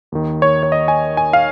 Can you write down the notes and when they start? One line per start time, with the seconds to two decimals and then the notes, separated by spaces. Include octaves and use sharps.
0.12 D#2 D#3
0.42 C#5
0.63 C#5
0.72 D#5
0.88 G#5
1.17 G#5
1.33 F5